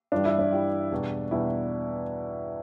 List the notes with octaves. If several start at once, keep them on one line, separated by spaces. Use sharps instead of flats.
G2 E3 G3 D4
E4
D4
G2 E3 G3
E2 B2 G3
E2 B2 G3 E4